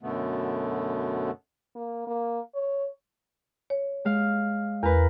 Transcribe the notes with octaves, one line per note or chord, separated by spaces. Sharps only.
F#2 B2 D3 A3 B3
A#3
A#3
C#5
C#5
G#3 F5
E2 A#4 B4